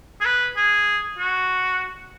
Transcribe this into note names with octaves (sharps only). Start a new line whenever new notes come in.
G#4
B4
G#4
F#4